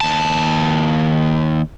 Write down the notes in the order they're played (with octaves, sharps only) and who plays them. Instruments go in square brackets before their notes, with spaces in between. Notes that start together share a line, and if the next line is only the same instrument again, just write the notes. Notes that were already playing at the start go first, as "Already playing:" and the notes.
[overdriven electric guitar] D#2 A5